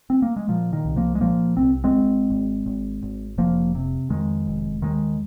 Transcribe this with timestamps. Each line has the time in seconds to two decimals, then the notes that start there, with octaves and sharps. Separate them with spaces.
0.10 C4
0.22 A#3
0.36 G#3
0.48 A#2 F3
0.73 D#3
0.85 C2
0.96 F3 A#3
1.15 G#3
1.20 A#2 F3 A#3
1.57 C2 C4
1.84 G#3 C4
1.93 G#1
2.30 G#1
2.66 G#1
3.03 G#1
3.38 F1 F3 A#3
3.75 C3
4.10 F2 D#3 G#3
4.47 F1
4.82 D#2 D#3 G#3